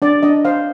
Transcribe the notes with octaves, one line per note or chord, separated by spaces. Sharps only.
D4 D5
D4 D#5
C5 F5